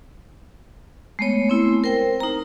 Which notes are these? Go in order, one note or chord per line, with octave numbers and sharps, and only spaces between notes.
G#3 A3 B3 C#5
A3 C4 E4
A#4 C5 G5
D#4 A#5